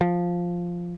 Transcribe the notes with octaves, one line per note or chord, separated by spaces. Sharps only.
F3